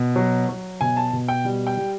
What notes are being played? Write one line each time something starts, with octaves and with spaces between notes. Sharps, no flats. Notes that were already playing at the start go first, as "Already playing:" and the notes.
Already playing: B2
F#3
F#3
B2 G#5
A5
B2
G5
G3
G5
G3